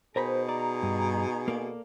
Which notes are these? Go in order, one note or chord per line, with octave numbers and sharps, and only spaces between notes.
B2 D#4 G#4 A#4 C5 A#5 B5
D5 A#5
G2
A#3 A4 D5